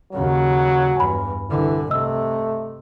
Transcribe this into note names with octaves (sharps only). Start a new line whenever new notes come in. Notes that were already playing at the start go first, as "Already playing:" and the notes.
D#2 C#3 F#3
E2 G2 G#5 B5
C2 D3 E3
C3 A3 D#5 E6